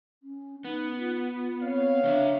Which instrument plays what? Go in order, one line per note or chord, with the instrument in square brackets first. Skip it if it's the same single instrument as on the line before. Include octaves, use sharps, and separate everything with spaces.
[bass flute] C#4
[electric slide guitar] B3 [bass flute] D#4
[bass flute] F4
[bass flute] C4 [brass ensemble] C#5 F5
[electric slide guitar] C#3 D#5 E5 [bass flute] D4